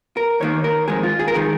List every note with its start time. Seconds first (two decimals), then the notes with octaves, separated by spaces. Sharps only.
0.17 A#4
0.40 D#2 D#3 A#3 C#5
0.64 A#4
0.88 F2 D#3 G#3 G#4
1.03 F4
1.19 G#4
1.28 A#4
1.35 D#3 G#3 G#4